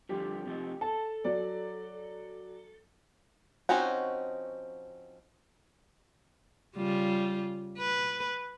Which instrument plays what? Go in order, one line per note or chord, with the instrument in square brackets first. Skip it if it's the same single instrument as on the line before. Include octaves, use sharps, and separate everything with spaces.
[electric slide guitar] D3 F3 G3 [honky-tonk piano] G4
[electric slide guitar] C3 F3 D#4
[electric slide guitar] A4 [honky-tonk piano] A5
[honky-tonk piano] F#3 D5
[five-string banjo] F3 C4 C#4 D#4 F#4
[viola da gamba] C#3 G3 F4
B4